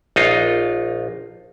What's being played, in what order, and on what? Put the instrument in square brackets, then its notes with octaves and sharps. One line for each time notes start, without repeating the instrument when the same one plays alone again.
[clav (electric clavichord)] A#1 D#4 F4